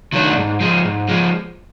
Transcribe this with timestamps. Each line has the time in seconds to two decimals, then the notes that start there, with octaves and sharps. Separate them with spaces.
0.13 D#3 F#3 A3 D4
0.37 G#2
0.61 F3 G#3
0.85 G#2
1.09 F3 G#3